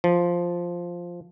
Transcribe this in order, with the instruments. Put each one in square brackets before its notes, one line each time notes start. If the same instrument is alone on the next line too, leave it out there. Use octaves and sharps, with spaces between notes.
[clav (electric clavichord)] F3